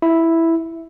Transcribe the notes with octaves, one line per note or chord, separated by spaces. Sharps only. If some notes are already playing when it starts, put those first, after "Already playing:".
E4